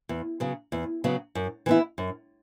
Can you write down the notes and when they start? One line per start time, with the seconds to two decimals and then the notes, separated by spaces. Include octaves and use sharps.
0.09 E2
0.40 C#3 F#3 B3
0.72 E2
1.04 C#3 F#3 B3
1.35 F#2
1.66 E3 B3 E4
1.98 F#2